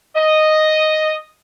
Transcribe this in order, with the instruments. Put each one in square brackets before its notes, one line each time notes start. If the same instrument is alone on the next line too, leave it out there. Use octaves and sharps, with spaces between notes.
[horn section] D#5